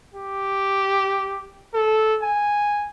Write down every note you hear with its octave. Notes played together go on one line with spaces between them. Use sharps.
G4
A4
G#5